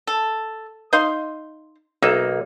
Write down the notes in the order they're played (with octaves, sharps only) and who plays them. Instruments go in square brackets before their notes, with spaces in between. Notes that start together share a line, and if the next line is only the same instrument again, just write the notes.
[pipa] A4
D#4 F5 C6
[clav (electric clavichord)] B1 A#3 D#4 [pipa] E5